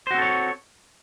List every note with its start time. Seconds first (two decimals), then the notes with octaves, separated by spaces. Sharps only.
0.07 C5
0.11 F#4
0.14 C4
0.18 A4
0.22 C#5